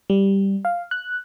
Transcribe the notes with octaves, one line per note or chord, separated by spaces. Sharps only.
G3
F5
F#6